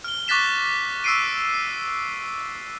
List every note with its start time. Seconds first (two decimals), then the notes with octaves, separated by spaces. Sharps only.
0.04 F6 G7
0.28 C#6 D6 F#6 A6 B6 E7
1.04 C#6 E6 F#6 C7 D7 D#7
1.54 C7